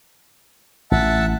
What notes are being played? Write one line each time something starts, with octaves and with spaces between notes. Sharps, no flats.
A1 E5 F#5 A5